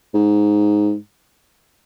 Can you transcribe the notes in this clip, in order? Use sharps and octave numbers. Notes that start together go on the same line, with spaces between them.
G#2